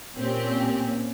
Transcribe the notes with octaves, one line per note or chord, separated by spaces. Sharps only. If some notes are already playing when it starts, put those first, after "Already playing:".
A#2 C4 C#4 G4